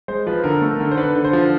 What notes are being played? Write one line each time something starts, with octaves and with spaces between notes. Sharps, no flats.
G#3 C5
F3 B4
D3 A#4
A3
A#4
D3
C5
D3 B4
D3
C5
F3